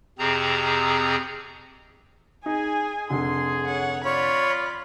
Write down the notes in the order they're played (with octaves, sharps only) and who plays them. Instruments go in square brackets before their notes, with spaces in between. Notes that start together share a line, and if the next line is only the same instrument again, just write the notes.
[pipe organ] F2 C3 C4 G#4 A#5
[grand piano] D#4 [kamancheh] G#4 G#5
[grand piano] F1 D3 [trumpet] G#4 [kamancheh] C6
[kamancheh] C#5 F#5
[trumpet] F4 [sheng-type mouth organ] C#5 [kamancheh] D5 B5